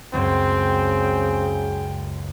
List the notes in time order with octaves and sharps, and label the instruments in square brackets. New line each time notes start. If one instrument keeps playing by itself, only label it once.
[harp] C#2 F#2 [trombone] C#3 [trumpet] C4 [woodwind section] G5